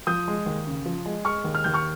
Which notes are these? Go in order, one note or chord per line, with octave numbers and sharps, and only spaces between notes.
F3 D#6 G6
G#3
D#2
C#3
F3
G#3
G#3 C#6 F6
D#2
F6
D#2 G6
C#6 F6